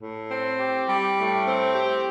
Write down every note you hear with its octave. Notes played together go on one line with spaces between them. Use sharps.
A2
C4
G4
G3
A2
C4
G4